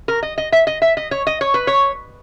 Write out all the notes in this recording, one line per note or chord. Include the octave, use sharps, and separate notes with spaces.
A#4
D#5
D#5
E5
D#5
E5
D#5
C#5
D#5
C#5
B4
C#5